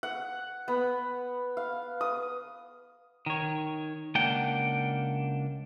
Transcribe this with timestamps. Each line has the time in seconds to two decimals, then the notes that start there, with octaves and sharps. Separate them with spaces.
0.03 F#5
0.68 B3
1.57 F5
2.01 D#6
3.26 D#3 C#5
4.15 C#2 A#3 D4 F#5 G5